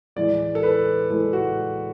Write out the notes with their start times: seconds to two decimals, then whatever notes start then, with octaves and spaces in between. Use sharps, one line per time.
0.16 A2 E3 G#3 D5
0.55 A4
0.63 B4
1.10 A2 E3 G#3 A4
1.33 F#4